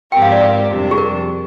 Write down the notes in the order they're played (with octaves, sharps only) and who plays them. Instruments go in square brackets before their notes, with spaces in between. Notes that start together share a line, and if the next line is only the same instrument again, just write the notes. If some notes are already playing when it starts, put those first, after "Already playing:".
[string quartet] G#2 F3 C4 G4 A#4 [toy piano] G5
[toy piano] F5
D5
[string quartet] F2 C3 G3 D4
[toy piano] G#4
A#4